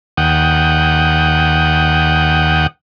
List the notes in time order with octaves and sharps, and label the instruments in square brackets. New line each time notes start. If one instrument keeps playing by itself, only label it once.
[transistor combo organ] D#2 F#5 G5 D#6